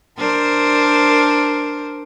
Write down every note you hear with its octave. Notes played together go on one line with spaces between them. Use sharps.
D4 A#4 C5